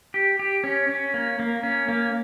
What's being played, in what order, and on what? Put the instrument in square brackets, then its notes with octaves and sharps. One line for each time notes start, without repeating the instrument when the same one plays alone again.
[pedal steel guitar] G4
G4
C#4
C#4
A#3
A#3
C#4
A#3